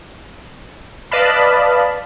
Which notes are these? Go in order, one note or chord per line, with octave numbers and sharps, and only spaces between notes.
B4 D5 D#5 F5 A5 B5